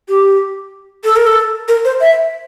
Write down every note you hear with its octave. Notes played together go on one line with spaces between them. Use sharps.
G4
A4
A#4
A4
A#4
C5
E5